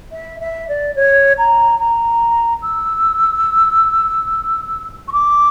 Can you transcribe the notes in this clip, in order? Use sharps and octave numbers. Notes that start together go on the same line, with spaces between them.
E5
E5
D5
C#5
A#5
A#5
E6
C#6
D6